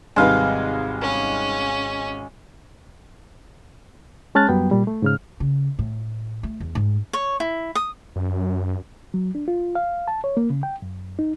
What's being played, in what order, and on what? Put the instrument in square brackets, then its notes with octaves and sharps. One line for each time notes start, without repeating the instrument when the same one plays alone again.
[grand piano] G#1 C3 [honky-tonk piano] G3 D#4 B4 [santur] G#3 F5
[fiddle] C#4
[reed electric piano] G#3 C#4 A5 F6 F#6 A6
F#2 F#3 G3 B3 G5
A#2 G3
A3
G#2 C#3 F6
[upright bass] C#3
A2
A3
E2
G#2
[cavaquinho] C#5
E4
D#6
[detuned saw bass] F#2
[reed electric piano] F#3
D4
F4
F5
A5
C#5
A#3
C#3
G5
F#2
D#4